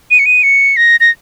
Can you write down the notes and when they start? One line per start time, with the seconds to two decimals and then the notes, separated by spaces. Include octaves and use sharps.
0.11 D#7
0.19 C#7
0.26 D#7
0.43 C#7
0.77 A#6
1.00 A#6